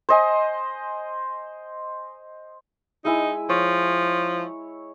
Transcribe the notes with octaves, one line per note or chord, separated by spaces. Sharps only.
C5 D#5 G#5
G#3 D#4 E4 G#5
F3 C#5